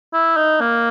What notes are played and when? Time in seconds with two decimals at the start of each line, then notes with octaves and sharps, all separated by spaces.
0.13 E4
0.37 D#4
0.60 A#3